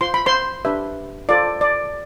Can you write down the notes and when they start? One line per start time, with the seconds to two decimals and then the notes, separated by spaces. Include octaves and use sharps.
0.01 F4 C5 C6
0.14 B5
0.26 C5 C6
0.65 D4 G4 B4 E5
1.29 F4 A4 C5 D5
1.61 D5